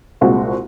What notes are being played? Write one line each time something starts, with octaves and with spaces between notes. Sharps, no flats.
C2 A#2 G#3 C4 F#4